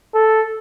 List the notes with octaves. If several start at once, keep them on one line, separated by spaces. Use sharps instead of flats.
A4